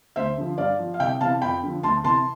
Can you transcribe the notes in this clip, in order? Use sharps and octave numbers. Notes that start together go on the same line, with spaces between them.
D2 C5 E5
D3 F3
G2 D5 F5
F3
F5
C2 E5 G5
C3 E3 F5 A5
F2 G5 B5
D3 F3
D2 A5 C6
C3 E3 A5 C6